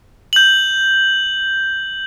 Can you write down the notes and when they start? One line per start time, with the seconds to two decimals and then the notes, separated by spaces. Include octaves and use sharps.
0.33 G6 F#7